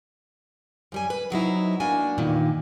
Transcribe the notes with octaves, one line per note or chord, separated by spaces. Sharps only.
F#2 G3 G#5
B4
C3 F#3 D#4 E4
A#3 D4 F#4 G#5
E2 G2 A#2 D#3